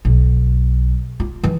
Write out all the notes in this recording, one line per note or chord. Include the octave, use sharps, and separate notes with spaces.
B1
F4
E3